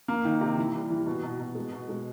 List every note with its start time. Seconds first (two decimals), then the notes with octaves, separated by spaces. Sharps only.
0.08 A#3
0.25 D#3
0.41 C3
0.57 E3
0.74 G3
0.90 E3
1.06 B2
1.23 B2
1.40 B2
1.55 G#3
1.72 B2
1.89 G#3